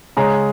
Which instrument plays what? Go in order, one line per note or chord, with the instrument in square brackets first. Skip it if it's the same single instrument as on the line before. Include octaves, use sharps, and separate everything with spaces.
[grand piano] C#3 G#3 C#4 A#5